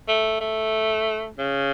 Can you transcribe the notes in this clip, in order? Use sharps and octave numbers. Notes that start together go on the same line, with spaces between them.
A3
A3
C#3